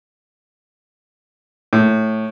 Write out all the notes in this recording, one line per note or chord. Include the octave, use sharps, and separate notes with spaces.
A2